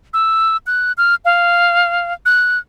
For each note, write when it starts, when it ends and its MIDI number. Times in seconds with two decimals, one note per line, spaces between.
0.14 0.57 88
0.67 0.92 90
0.98 1.15 89
1.25 2.13 77
2.26 2.59 90